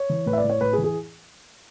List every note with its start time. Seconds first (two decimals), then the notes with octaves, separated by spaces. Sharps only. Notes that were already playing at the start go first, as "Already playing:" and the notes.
Already playing: C#5
0.10 E3
0.26 A2 B4
0.33 E5
0.38 D5
0.44 A2
0.49 C#5
0.61 A2 B4
0.73 G#4
0.78 E3
0.84 G#4